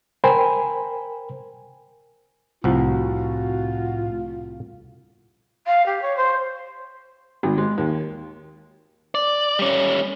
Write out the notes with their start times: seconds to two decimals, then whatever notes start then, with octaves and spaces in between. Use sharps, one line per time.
0.24 A#4 C5 G5 G#5 B5
2.64 C2 A2 F3 F4 F#4
5.66 F5
5.86 G4
6.02 C#5
6.16 C5
7.43 G#1
7.58 G#3
7.78 D#2
9.15 D5
9.59 G3 C#4